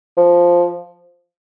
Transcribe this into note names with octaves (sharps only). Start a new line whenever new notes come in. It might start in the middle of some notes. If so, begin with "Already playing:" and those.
F3